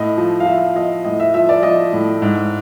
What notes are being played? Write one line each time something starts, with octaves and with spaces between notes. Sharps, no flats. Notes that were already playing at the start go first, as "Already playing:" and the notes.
Already playing: A2 D#5
F3
F5
F3 E5
F3 D#5
A2 D#5
E5
F3 E5
D5
F3 D#5
A2
G#2